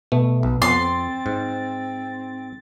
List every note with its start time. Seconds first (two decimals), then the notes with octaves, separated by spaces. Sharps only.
0.12 B2 A3
0.43 B1
0.62 F2 B3 C6 A6
0.80 C4
1.26 G#2